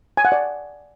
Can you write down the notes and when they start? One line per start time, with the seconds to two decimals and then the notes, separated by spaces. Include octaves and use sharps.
0.17 G#5
0.25 F#5
0.32 D5